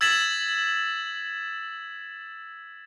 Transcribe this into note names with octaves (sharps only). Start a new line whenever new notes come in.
E6 G#6 A6 B6 E7 F#7